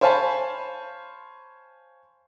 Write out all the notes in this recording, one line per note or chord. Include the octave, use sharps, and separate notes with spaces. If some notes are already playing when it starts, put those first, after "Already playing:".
C5 C#5 F5 G#5 A5 B5